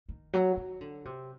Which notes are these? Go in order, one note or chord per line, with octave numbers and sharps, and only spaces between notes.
D#3
F#3
D#3
D3
C3